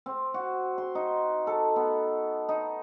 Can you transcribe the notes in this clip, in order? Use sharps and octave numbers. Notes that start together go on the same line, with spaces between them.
C4
F#4
C6
D#4
A4
B3
D#4